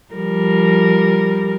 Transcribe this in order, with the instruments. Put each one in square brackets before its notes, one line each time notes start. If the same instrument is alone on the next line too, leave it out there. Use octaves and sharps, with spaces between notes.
[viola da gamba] F3 G3 A#4